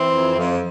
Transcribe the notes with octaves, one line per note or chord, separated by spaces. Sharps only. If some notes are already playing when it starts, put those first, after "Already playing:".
Already playing: E3 C4
F2
F2